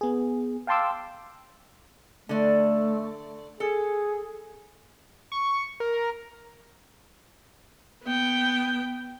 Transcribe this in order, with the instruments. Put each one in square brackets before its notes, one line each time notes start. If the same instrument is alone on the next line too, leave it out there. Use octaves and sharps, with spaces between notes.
[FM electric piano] B3 G#4
F5 G5 A5 C6 D6 E6
[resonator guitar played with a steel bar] D3 D5 [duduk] A3
[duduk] G#4 [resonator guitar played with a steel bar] A4
[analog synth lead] C#6
A#4
[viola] B3 G5